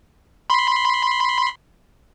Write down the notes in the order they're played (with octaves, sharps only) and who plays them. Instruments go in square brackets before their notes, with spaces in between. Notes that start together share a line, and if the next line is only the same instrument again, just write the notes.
[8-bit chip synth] B5 C6